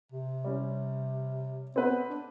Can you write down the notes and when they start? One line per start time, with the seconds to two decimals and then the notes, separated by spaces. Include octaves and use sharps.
0.12 C3
0.44 G3 C#4
1.76 B3 C4 B4
2.09 D4